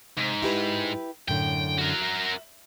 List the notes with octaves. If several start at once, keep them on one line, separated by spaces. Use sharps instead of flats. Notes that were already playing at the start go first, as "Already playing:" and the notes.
G#2 C3
E4 G4 B4
F#2 A2 D3 G5
F#4 A#4
E5